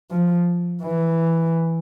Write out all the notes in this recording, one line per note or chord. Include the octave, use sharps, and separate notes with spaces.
F3
E3